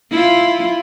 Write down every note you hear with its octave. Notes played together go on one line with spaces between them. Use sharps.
E4 F4